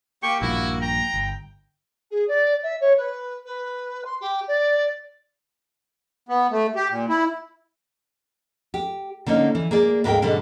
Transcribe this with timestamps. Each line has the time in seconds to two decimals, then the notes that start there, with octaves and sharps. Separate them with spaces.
0.23 A#3 G4 G5 C#6
0.42 A#1 G2 A#2 A#3 E4 F#4
0.81 G5 A#5
1.14 G1
2.11 G#4
2.28 D5
2.63 E5
2.80 C#5
2.97 B4
3.45 B4
4.04 C6
4.20 G4
4.47 D5
6.29 B3
6.51 A3
6.76 G4
6.90 A#2
7.09 E4
8.74 G4
9.26 D3 A#3 C#4 D#4
9.55 E3
9.71 A#3 G#4 D5
10.04 D2 G#2 A#4 E5 F5 G5
10.22 G#2 B2 D3 G3 D4